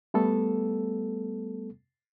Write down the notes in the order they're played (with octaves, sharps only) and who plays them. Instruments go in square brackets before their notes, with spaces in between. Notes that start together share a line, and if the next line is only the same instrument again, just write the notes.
[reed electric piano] G3 A3 B3 A4